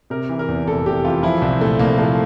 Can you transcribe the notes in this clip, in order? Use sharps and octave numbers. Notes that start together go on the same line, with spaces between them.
C3 A#4
E3
A#4
E2
F1 A4
C3 G4
E3 F4
F3 E4
C2 C4
A#2 A3
C2 A#3
F3 A3